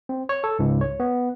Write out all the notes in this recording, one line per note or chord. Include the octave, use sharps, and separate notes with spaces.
C4
C#5
A4
C#2 G#2
C#5
B3